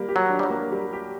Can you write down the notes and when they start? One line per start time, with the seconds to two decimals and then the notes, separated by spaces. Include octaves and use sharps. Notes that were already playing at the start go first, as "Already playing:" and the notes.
Already playing: G3 A#3
0.09 G4
0.16 F#3
0.30 D4
0.39 G3
0.43 F#3
0.50 A#3
0.72 G3
0.93 G4